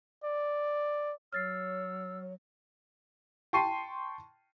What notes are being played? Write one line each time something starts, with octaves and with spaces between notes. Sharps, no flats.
D5
F#3 C#5 E6 F6 A6 C7
G5 A5 C6 C#6 C7 D#7